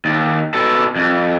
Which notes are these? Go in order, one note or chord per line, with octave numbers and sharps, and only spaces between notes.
D#2
B2 A4
F2